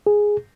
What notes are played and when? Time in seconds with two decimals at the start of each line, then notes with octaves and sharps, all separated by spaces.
0.07 G#4